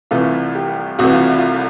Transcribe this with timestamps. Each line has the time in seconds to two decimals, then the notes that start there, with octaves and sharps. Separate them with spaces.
0.11 C2 C3 E3 A3 F4
0.55 G4
0.99 C2 C3 E3 A3 F#4
1.13 F4
1.26 E4
1.38 F4